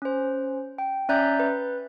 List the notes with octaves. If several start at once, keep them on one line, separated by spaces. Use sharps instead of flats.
C#4 C5
G5
C#4 D5 E5 A#5 F#6 G6
B4